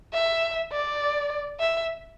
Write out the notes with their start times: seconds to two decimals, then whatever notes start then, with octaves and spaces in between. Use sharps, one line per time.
0.13 E5
0.72 D5
1.60 E5